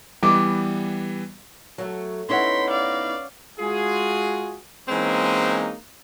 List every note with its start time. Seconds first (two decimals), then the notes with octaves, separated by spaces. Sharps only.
0.23 E3 G3 B3 D6
1.78 F#3 A3
2.29 B3 C#4 D#4 E4 C#5 F#5 C6 B6
2.70 D5 F5
3.59 G#3 F4 F#4 G#4
4.89 E3 G#3 A#3 C4 C#4 D#4